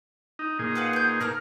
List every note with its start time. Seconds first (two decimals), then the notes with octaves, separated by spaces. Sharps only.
0.39 D#4
0.59 A#2 D#4 G#4
0.75 B4 F5 F#5
0.93 B3 G6
1.20 A#3 A#5 F6